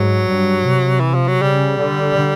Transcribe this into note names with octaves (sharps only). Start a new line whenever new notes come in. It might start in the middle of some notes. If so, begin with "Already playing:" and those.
Already playing: G#2 F#3
G2
C3
E3
F3
F#3
C#3 G3
D3